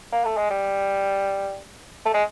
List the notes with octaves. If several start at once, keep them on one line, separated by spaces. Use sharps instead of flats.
A#3
A3
G#3
G3
A3
G#3